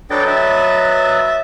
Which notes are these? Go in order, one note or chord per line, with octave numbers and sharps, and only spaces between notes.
F#3 D4 A4 B4 D#5 G5 A6
E5